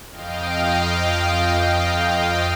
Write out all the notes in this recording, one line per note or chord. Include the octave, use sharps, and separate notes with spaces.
F2 D#5 F5 G5